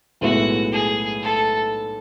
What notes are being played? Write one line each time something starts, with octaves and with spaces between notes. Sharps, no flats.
B1 A2 G#3 B3 E4 F#4
G#4
A4